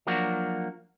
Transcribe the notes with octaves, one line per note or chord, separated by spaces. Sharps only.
F3 F#3 A#3 D4 F#4